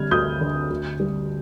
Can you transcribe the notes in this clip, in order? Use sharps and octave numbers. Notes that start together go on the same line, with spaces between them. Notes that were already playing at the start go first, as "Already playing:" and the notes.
Already playing: D3 G3 F6 G#6
D2 D#6 G6
D3
D2
G3